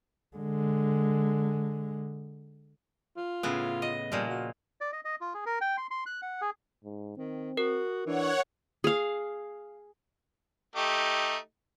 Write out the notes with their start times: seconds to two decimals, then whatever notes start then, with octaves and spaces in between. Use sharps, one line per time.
0.36 D3 G#3
3.17 F4
3.43 A2 C#3 B3
3.82 D#5
4.12 A#2 F3 G3
4.29 F#4
4.81 D5
4.93 D#5
5.05 D#5
5.21 F4
5.34 G#4
5.46 A#4
5.61 G5
5.77 C6
5.91 C6
6.06 F#6
6.22 F#5
6.41 G#4
6.84 G#2
7.17 D#3 C4
7.57 F#4 A#4
8.06 E3 D4 C#5 F#5
8.84 G#4 F5
10.76 A3 D#4 G4